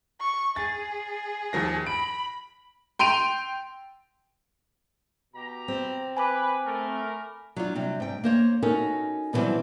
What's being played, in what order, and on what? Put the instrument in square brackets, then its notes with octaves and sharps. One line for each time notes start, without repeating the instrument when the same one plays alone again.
[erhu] C#6
[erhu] G#4 [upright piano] A6
[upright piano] D#2 F3 A#6
[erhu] B5 [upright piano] D7
[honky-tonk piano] G5 C6 D7 D#7 F7
[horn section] B2 G4 A#5
[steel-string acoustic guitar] C4
[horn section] B4 [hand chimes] G#5 B5 D6
[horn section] A3 A#4
[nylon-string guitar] F#3 D4 F4
C3 F#3 G3
G#2 G5
A#3 C5 C#5
C#4 D#4 F#4 A4 A#4
B2 D3 E3 F#3 G3 C4